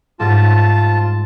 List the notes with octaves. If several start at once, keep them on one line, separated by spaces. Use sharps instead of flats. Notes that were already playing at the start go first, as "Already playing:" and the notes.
G#2 G3 C4 F4 A5